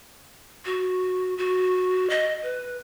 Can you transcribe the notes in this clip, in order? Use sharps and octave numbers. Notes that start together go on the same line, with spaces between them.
F#4
F#4
D#5
B4